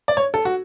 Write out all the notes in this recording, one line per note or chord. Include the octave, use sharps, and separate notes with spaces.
D5
C#5
A4
F#4